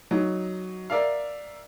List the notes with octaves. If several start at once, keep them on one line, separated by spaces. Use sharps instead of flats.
F#3 D#4
A#4 D5 E5 F5